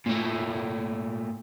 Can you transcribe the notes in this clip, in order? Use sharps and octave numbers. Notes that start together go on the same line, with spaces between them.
A#2 A3